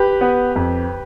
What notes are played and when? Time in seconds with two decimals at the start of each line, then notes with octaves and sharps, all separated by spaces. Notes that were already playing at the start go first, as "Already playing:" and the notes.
Already playing: G4 B4
0.21 B3
0.56 F2